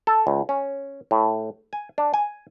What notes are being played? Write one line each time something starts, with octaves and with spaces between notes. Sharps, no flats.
A4
C#2
C#4
A2
G#5
D4
G#5